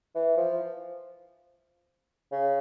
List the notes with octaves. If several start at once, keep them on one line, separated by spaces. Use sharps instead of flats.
E3
F3
C#3